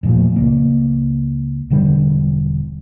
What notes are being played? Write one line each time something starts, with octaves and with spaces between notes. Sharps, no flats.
E1 A#2 F3 A3
C#2 A#3
E1 D3 G3 D4